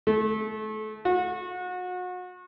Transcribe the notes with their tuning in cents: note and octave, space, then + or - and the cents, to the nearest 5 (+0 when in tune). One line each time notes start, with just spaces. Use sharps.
A3 -30
F#4 -35